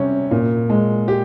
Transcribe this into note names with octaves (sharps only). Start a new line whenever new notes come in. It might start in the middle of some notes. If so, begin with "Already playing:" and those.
Already playing: C3 G3 C#4
A#2
G#3
G4